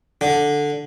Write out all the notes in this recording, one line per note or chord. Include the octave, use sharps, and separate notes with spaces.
D3